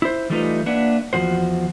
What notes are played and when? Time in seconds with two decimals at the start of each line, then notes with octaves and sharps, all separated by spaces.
0.02 E4 C5
0.30 E3 G3 A3 D#4 F4 B4
0.66 A#3 D4 B4 E5 F#5
1.13 E2 D#3 F3 F#4 C5